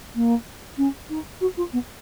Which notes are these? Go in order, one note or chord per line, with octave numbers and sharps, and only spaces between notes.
A#3
C#4
D#4
F#4
F4
B3